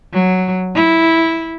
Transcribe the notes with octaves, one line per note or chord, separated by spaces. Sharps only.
F#3
E4